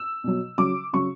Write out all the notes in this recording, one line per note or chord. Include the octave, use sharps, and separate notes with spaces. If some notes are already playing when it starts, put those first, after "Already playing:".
Already playing: E6
B2 F#3
C#3 F#3 D6
C#3 F#3 C#6